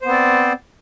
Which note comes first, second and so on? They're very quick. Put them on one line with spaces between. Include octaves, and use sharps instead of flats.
C5 B3 C4 D5